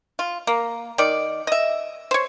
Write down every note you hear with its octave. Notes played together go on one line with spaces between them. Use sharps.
F4
A#3
D#3 D5
D#5 E5
C5 C#5